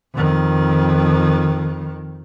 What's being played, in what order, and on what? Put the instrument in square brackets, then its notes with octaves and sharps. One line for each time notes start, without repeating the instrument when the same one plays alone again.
[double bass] F2 D#3